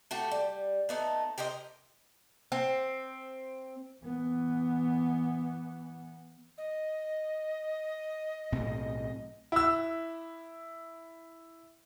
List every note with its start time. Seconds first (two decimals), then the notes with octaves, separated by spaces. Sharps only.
0.11 A3 F#4 G4
0.31 G3
0.89 A3 B3 D#4
1.38 G4 A#4 C5 D#5
2.52 C4
4.02 E3 B3
6.58 D#5
8.52 B1 A2 C4
9.52 E4 E6